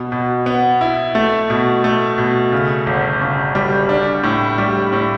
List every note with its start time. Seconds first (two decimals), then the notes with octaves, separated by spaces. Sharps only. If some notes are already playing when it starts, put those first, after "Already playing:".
Already playing: B2
0.12 B2
0.46 B3
0.81 E4
1.15 A3
1.50 B2
1.84 A3
2.18 B2
2.52 C#3
2.87 G1
3.21 C#3
3.55 G3
3.89 D4
4.23 A2
4.58 G3
4.93 A2